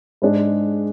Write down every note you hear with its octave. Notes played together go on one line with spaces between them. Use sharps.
G#2 G#3 D4 G#4